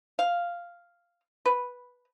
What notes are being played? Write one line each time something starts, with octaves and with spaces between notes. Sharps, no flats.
F5
B4